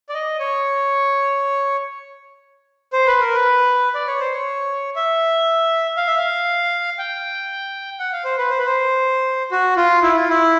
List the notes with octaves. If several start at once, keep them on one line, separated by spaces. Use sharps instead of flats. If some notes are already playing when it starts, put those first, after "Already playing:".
D5
D#5
C#5
C5
B4
A#4
B4
D5
C#5
C5
C#5
E5
F5
E5
F5
G5
F#5
F5
C5
B4
C5
B4
C5
F#4
F4
E4
F4
E4